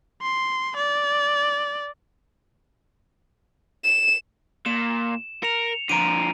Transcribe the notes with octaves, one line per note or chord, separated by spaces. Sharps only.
C6
D5
E7
A#2 E7
A#4 C#7 F7
D3 F3 A#5 D7 D#7